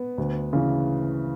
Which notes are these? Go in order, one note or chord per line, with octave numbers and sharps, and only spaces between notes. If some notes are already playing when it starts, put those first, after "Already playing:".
Already playing: B3
D2
C#3 E3